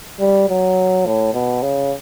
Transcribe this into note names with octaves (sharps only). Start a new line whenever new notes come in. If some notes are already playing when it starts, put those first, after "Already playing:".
G3
F#3
A2
B2
C#3